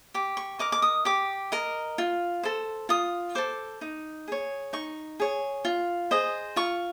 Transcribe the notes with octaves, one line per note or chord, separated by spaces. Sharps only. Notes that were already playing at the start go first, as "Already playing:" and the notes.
G4 D6
C#6
A#4 D#5 D6
D6
D#6
G4 D6
A#4 D#5
F4
A4 C5
F4 D#6
A4 C5 D6
D#4
G#4 C#5
D#4 C#6
G#4 C#5
F4
G#4 C5 D#5
F4 C#6